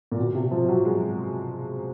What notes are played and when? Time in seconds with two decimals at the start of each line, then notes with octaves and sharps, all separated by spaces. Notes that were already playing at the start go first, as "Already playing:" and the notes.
0.12 A#2
0.18 B2
0.35 C3
0.52 F3
0.69 F#3
0.85 G#3